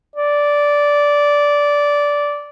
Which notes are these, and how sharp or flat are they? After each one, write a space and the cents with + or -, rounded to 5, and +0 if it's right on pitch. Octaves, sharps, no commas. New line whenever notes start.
D5 -10